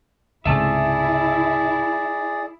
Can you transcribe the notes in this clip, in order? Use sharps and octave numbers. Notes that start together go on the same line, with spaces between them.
C#2 G#2 C3 E4 G#4 D5 E5 A5